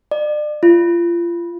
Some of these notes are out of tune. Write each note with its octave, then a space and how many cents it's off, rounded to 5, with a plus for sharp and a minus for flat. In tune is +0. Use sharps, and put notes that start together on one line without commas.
D5 +35
F4 -30